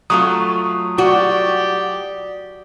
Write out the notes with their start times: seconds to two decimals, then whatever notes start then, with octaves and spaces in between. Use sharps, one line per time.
0.10 F#3 A3 F4 D#6
0.98 F#4 G4 D5 G5